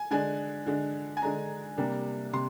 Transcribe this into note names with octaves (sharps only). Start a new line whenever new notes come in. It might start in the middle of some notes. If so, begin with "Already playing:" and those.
Already playing: G#5
D3 G#3 D4 G#5
D3 G#3 D4
G#5
D3 G#3 D4 A#5
C3 G3 A#3 D4
C3 C6